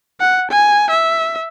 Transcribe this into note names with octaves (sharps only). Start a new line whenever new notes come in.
F#5
G#5
E5